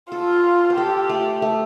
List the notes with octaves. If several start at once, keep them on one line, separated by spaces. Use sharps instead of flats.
F4 A4
C5
G4 A4
A3
A3